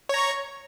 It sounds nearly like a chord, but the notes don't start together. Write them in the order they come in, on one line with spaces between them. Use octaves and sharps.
C#5 A#5 C#6